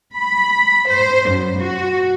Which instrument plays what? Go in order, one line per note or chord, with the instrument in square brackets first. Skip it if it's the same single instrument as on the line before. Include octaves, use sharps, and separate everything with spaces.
[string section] B5
C5
F#2
F#4